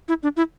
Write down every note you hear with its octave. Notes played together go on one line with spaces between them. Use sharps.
E4
D4
E4